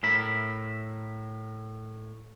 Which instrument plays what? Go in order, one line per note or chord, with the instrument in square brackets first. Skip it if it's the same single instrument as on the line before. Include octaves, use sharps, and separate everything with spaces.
[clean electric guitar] A2 A#4 E5 B5